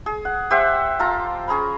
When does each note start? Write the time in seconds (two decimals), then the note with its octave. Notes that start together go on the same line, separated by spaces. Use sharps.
0.06 G#4
0.25 F#5
0.50 G4 C5 E5 F#5
0.99 F4 A4 A#5
1.48 C#4 G#4 A#5 B5